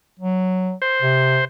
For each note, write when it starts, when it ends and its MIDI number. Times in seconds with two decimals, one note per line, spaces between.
0.20 0.73 54
0.82 1.45 72
1.02 1.42 48